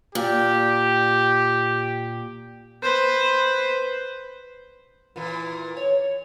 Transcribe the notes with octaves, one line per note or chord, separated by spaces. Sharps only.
A#2 G4
B4 C5
A#2 E3
C#5